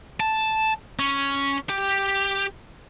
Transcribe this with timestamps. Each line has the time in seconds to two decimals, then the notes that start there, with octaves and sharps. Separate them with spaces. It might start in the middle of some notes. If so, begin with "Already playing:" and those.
0.20 A5
0.99 C#4
1.69 G4